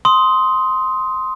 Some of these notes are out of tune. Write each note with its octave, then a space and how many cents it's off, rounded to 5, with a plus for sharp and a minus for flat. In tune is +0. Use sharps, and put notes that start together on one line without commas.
C6 +0 D#6 +15